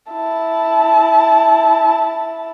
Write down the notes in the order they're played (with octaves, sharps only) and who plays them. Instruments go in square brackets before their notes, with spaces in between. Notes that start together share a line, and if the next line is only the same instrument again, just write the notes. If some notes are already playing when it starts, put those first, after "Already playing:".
[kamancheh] E4 A5